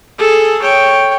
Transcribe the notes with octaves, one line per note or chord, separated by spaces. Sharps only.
G#4 A4
C#5 G5